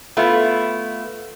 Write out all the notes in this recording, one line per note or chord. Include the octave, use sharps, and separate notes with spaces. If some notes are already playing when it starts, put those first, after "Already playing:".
A3 B3 E4 F4